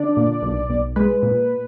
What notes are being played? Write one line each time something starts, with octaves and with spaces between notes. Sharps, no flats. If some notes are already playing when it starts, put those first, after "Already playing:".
Already playing: D3 D4 D5
A#2
B1
B1
G#3 B4
A#2